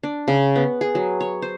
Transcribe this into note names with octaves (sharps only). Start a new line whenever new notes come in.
D4
C#3
B3
G#4
F#3
C#5
C5